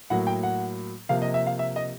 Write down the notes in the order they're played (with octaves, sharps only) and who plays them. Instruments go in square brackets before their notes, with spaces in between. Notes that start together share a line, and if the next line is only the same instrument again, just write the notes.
[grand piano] A2 F#3 A#3 F#5
G5
F#5
C3 F3 A#3 F5
D#5
E5
F5
E5
D#5